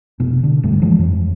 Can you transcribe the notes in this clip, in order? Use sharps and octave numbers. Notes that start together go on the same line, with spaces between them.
F1 B2
D3
D1 G2 A3
E3 F3 G#3
F2